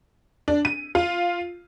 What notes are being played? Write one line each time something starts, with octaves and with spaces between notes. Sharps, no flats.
D4
D#7
F4